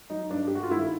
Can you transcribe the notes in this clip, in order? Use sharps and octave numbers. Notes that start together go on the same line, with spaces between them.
F#3 D#4
G2 D4
G2 G4
F#4
F4
D#3 E4